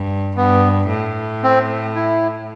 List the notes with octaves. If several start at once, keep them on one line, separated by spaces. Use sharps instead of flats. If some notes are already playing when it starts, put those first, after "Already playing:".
Already playing: G2
G2 B3
A2
C4
E4